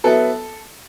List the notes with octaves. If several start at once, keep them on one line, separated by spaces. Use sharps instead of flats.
F#3 B3 E4 A4